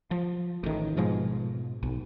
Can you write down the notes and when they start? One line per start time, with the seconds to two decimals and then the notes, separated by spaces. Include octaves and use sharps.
0.11 F3
0.64 A1 A2 D#3
0.96 G#2 B2 F3 G#3
1.83 B1